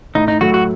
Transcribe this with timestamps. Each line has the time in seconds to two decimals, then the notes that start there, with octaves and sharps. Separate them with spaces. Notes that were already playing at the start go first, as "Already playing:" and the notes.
0.15 A2 D#4
0.28 D#4
0.41 F#3 A3 F#4
0.54 F#4